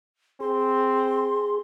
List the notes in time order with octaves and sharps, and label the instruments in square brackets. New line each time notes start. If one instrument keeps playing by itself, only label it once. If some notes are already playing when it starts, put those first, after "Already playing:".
[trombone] C4 [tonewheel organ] G#4 [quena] C6